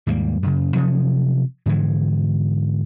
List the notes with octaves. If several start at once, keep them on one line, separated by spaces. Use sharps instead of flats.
D#2 G#2 G3 A#3
F#2 C#3
C3 F3 F#3 C#4
G#2 D3 E3 F3